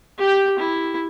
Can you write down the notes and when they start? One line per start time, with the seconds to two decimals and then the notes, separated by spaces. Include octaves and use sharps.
0.18 G4 G5
0.59 E4